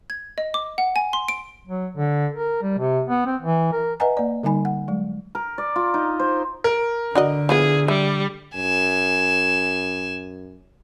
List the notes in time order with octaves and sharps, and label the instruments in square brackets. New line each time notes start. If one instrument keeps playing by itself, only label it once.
[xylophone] G#6
D#5
D6
F#5
G#5
C6
D7
[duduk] F#3
D3
A#4
G3
C3
B3
C4
E3
A#4
[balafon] B4 D#5 E5 F#5 G#5 A#5
A#3 D5
D3 G3 D#4 G#5 B5
F#5
F#3 G#3
[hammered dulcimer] A#4
D5
F4
D#4
C5
[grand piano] A#4
[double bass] D3 [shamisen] D4 F#4 D#5
[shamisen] F3 B3 E4 [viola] G#4
[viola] G3 [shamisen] E5
[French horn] F#2 [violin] G#5 E7